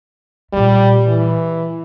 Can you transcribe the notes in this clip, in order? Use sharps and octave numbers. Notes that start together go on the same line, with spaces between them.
A#2 G3 A3
E3